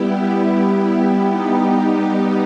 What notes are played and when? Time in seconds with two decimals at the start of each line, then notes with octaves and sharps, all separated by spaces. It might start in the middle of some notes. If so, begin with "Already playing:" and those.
Already playing: G3 B3 E4 G4
1.26 G3 B3 D#4 G4